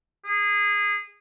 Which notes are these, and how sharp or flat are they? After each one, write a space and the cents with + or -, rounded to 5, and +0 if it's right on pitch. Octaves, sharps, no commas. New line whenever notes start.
G#4 -20